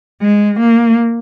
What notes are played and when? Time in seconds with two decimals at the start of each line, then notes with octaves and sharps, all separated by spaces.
0.21 G#3
0.60 A#3